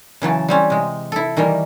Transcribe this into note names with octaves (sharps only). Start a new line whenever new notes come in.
C#3 E3 F#3 A5
G3 C4 C#4
C3 G#3
E4 A4
D#3 E3 G3 A#3